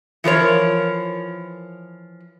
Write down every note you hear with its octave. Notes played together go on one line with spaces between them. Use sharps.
E3 F3 A#4 C#5